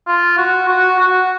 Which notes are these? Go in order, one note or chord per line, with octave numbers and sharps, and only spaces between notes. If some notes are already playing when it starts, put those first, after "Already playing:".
F4
F#4
F#4
F#4